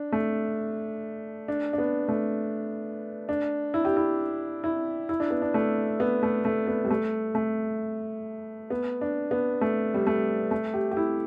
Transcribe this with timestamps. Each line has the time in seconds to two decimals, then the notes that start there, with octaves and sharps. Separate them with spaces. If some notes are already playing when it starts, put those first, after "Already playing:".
Already playing: D4
0.12 A3
1.48 D4
1.73 D4
1.78 B3
2.08 A3
3.29 D4
3.74 E4
3.85 G4
3.97 E4
4.64 E4
5.09 E4
5.20 D4
5.31 B3
5.42 D4
5.54 A3
6.00 B3
6.23 A3
6.45 A3
6.67 B3
6.85 G3
6.90 A3
7.35 A3
8.70 B3
9.01 D4
9.31 B3
9.61 A3
9.94 G3
10.07 A3
10.51 A3
10.74 G4
10.91 G4
10.97 E4